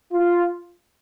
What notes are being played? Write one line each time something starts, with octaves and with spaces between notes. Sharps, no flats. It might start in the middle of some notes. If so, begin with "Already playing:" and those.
F4